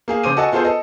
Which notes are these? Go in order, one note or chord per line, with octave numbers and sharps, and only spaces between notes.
A#3 G#4 F5
C#3 C5 D6 D#7
F#4 A4 D#5 G#5 A5
B3 F4 G#4 A4 C5
A4 D#5